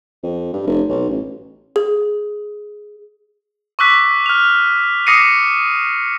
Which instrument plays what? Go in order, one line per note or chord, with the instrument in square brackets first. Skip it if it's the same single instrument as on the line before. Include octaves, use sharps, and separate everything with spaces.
[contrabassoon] F2
G2
F1
B1
A1
[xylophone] G#4
[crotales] C#6 D6 E6 F#6 B6
F6 F7
D6 D#6 A#6 C7 C#7 D#7